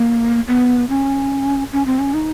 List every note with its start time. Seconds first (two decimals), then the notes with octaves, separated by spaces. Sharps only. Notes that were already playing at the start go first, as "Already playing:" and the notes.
Already playing: A#3
0.48 B3
0.89 C#4
1.72 C#4
1.86 C4
1.99 C#4
2.14 D#4